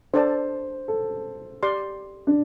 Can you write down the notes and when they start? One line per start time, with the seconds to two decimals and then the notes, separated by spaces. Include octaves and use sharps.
0.13 D4 A4 C5 D5 A5
0.88 A4
1.63 G4 D5 C6
2.27 D4